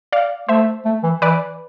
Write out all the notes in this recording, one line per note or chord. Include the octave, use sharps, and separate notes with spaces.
D5 F5
A3 C5 E5
A3
E3
E3 B4 D5